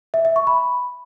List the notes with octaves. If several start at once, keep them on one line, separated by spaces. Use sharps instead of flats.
E5
E5
C#6
B5